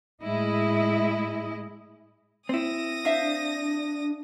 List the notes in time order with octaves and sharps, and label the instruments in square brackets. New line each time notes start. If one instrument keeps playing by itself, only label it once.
[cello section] A2 G#3 E4 D#5
[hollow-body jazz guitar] C4 E4 [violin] D#6 A#6
[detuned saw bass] D4 [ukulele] C5 E5 F5